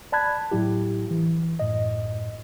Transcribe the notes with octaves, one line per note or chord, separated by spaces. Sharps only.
D5 A5 B5 F#6 G#6
A2 F#3 E4 G4
E3
F#2 A2 D#5